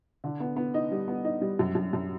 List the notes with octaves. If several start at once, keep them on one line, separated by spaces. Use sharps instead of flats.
D3
B3
B3
D#4
G3
B3
D#4
G3
F#2
F#2
F#2